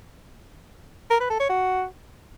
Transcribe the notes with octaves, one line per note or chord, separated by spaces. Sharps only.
A#4
B4
A4
C#5
F#4